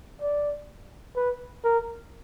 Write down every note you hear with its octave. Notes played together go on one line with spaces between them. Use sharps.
D5
B4
A#4